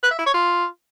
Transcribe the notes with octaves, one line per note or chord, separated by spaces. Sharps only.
B4
E5
E4
C#5
F4